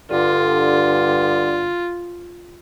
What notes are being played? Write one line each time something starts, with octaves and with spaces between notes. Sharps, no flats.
G2 D3 F4